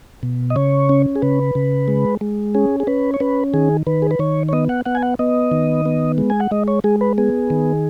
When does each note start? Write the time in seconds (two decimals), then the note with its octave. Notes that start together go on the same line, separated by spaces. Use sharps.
0.23 B2
0.50 D#5
0.56 C#3 C#5
0.89 C#4
1.16 G#4
1.22 C#3 B4
1.55 C#3
1.88 G#3
2.21 G#3
2.55 C#4 G#4
2.80 G#4
2.87 C#4 B4
3.14 C#5
3.20 C#4 B4
3.54 D#3 G#4
3.87 D#3 B4
4.02 G#4
4.11 B4
4.19 D#3 C#5
4.49 C#5
4.53 B3 D#5
4.69 F#5
4.86 B3 F#5
4.95 G#5
5.02 F#5
5.19 B3 D#5
5.52 D#3
5.85 B3
6.18 G#3
6.30 G#5
6.40 F#5
6.51 G#3 D#5
6.68 C#5
6.84 G#3 G#4
7.01 B4
7.18 B3 G#4
7.50 D#3